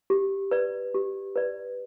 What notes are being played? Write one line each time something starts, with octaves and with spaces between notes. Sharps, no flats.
G4
B4 D5
G4
B4 D5